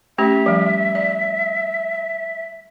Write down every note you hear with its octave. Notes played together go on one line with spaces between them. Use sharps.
A3 C#4 G4 E5
F3 G3
D5